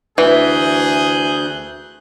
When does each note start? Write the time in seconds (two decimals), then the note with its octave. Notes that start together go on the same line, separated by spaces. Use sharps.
0.18 D2 E3 G#4 F#6 G6